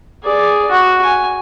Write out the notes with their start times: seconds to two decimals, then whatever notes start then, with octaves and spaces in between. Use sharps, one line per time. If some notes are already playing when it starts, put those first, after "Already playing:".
0.24 G#4 D5
0.71 F#4
1.02 G#5